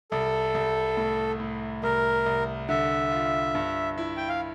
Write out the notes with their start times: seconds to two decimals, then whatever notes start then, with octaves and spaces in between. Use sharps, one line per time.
0.11 C2 A4
0.54 C2
0.97 A2
1.40 A2
1.83 C2 A#4
2.26 C2
2.69 D3 E5
3.11 F4
3.55 G2
3.98 E4
4.17 G5
4.29 F5